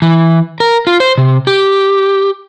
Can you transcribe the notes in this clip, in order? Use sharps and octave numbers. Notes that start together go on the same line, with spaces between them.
E3
A#4
F4
C5
C3
G4